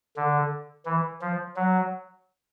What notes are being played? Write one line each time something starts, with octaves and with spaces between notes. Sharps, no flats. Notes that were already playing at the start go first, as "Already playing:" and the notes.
D3
E3
F3
F#3